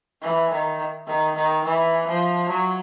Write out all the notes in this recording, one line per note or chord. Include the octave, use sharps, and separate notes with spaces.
E3
D#3
D#3
D#3
E3
F3
F#3